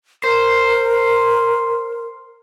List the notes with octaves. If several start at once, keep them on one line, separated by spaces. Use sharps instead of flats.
A#4 C5